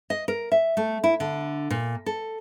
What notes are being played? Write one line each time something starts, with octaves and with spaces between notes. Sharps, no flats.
D#5
A#4
E5
A3
E4
D3
A#2
A4